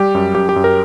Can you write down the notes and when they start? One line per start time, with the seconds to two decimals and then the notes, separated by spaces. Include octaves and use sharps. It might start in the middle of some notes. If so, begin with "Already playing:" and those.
Already playing: G3 G4
0.15 F#2
0.35 F#2 G4
0.49 G4
0.56 F#2
0.64 A#4